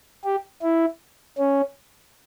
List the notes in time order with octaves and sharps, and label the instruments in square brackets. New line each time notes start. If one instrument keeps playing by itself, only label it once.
[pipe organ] G4
E4
C#4